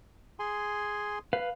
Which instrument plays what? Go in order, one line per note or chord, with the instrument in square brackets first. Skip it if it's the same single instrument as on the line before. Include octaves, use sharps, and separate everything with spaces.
[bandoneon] G#4 G#5 C6
[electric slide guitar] B4 F5